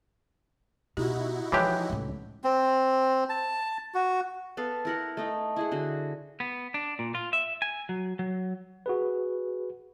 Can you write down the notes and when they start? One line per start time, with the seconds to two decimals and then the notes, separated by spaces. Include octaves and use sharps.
0.97 B2 D#4 E4 F#4 G4
1.52 E3 F3 G#3 G4 C#5 A5 F#6
1.90 C#2 A2
2.44 C4
3.29 A5
3.94 F#4
4.57 B3 A4 B4 F5
4.85 E4 A#4 F#5
5.17 A3 D#4
5.56 E4 G#4 F#5
5.72 D3 F#4
6.40 B3
6.74 D4
6.99 A#2
7.15 F4
7.33 E5
7.62 G#5
7.89 F#3
8.19 F#3
8.86 F#4 G#4 B4